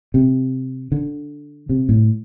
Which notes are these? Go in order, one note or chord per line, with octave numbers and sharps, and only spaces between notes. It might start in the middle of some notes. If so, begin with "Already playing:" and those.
C3
D3
C3
A2